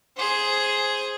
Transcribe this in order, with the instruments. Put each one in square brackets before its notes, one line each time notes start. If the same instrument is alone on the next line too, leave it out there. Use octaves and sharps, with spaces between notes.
[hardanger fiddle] G#4 C5